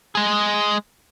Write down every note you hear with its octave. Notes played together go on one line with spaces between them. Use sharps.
G#3 G#4